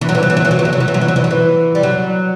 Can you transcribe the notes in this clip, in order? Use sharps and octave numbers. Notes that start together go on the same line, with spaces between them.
E3
F#3
E3
F#3
E3
F#3
E3
F#3
E3
F#3
E3
F#3
E3
F#3
E3
F#3
E3
F#3
E3
G3
F#3